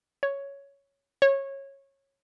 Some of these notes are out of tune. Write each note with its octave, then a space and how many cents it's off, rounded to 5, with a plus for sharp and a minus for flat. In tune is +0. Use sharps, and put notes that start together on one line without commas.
C#5 +5
C#5 -20